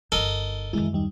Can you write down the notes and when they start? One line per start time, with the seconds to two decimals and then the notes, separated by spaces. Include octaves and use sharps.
0.12 G1 D#4 A4 A#4 D#5
0.73 F#2 D#3 E3 G#3 E4
0.93 D#2 G3 D#4